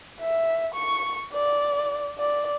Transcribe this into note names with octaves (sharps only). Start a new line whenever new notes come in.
E5
C#6
D5
D5